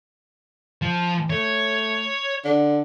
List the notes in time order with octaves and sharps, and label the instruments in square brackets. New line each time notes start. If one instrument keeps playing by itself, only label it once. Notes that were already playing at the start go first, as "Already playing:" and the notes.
[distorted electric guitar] F3
[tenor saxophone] A3 [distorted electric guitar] C#5
[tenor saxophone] D3